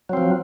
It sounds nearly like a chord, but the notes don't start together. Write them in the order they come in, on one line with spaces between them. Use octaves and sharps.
F#3 C4 F3